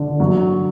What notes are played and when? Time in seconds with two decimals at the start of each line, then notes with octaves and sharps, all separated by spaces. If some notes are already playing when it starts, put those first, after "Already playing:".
Already playing: D3
0.20 F#3